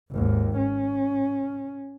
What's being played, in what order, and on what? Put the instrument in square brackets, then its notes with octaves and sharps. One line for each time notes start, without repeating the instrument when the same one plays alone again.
[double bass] G#1 D#2
C#4